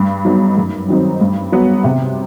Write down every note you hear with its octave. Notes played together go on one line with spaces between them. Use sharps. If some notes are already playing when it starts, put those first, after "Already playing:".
Already playing: G2
F#3 B3 D#4
F#2
D#3 F#3 C4 D#4
G2
F#3 B3
C3